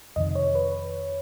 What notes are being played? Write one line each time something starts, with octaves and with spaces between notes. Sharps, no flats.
F2 C3 D#3 D#5
C#5
B4